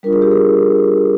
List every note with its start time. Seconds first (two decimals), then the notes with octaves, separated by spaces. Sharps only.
0.03 G3 D4 F4 A#4
0.13 G#4
0.22 G4
0.31 G#4